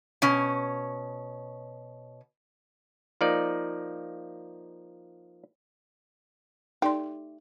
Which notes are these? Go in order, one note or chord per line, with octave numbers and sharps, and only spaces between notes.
B2 C#4
F3 A#3 D#4 D5
A3 D#4 G4 D5 C6